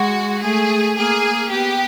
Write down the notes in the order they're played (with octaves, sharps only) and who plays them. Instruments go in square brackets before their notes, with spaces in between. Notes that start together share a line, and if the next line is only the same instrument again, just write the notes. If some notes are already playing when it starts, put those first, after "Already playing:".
Already playing: [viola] G#3 [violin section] F#4
[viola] A3 [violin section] G#4
[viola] A#3 [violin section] G#4
[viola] B3 [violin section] G4